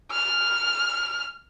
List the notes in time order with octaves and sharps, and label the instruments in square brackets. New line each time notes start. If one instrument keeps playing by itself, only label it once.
[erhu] F6